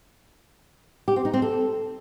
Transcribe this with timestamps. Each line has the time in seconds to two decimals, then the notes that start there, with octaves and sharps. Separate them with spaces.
1.08 G4
1.16 C4
1.25 D#4
1.34 C4
1.42 A4